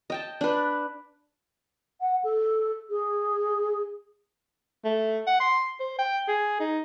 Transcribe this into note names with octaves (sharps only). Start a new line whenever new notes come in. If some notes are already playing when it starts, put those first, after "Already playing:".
D#5 G5 A5
D4 B4
F#5
A4
G#4
A3
F#5
C6
C5
G5
G#4
D#4